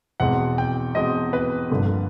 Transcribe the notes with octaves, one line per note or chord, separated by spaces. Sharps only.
E1 E2 B2 G#3 C4 F#5
G5
E1 E2 B2 G#3 C4 D#5
B4
G1 G2 D3 F3 A#3